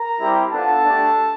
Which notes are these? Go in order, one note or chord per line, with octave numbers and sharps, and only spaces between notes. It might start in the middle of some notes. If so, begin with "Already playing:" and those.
Already playing: A#4 A#5
G3 C4 E4 G4
B3 D4 F4 A4 A5
A3 D4 G4